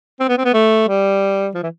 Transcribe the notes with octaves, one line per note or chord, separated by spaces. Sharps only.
C4
B3
C4
B3
A3
G3
F3
E3